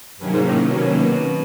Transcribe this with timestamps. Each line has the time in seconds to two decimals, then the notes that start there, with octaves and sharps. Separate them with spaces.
0.19 G2 C3 D#3 F#3 A#3 C#4
0.32 G#2
0.45 A2
0.70 B2